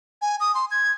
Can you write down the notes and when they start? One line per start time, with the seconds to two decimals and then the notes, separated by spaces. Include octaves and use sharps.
0.22 G#5
0.40 D#6
0.55 C6
0.71 G#6